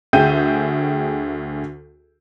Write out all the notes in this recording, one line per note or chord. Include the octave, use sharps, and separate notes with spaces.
D2 G#4 E5 G5 G6 D#7